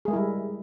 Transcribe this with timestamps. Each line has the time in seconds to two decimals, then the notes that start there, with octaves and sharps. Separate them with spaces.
0.05 G#4
0.08 G#3
0.11 A#4
0.13 E4
0.16 G3